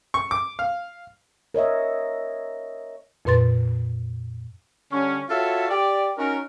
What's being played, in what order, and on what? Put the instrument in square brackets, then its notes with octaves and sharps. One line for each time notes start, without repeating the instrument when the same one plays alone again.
[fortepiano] C#6
D6
F5
[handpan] A#4 C#5 D#5 E5
[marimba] F2 A#2 B4 C6 A6
[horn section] D3 G3 C#4
F4 F#4 A4 C#5 E5
G4 D5
C#4 D#4 F#4 A#4